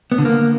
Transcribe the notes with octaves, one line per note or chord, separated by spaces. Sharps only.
B3
D3
A#3